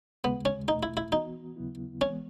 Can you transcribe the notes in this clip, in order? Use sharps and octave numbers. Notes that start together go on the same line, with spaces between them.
D#2 C#3 G#3 B3
C#4
E2 B2 A3 D#4
E4
E4
E3 B3 D#4 F#4
D#2 C#3 F#3 B3 E4
E3 G#3 B3 C#4